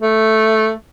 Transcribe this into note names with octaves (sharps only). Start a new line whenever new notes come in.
A3